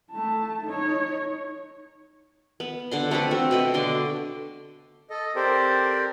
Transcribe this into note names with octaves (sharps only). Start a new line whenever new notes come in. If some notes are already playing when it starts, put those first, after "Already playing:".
A3 A5
D#4 C#5
B3
D3 F#5 C6
A3 C4 A4 B4
C4 F#4 E5
B2 B4 D#5
D3 C6 D6
A4 D#5
C4 G4 A4 A#4 C5 D5